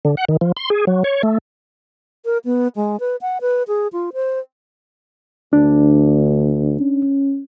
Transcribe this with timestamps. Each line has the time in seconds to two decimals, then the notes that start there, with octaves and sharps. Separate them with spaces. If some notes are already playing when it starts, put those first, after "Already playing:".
0.05 D3
0.17 F#5
0.29 D#3
0.41 F3
0.57 C6
0.70 G#4
0.87 F#3
1.04 C#5
1.23 A3
2.25 A#4
2.45 B3
2.76 G#3
3.00 B4
3.22 F#5
3.41 B4
3.68 G#4
3.93 F4
4.14 C5
5.53 D2 D4
6.80 C#4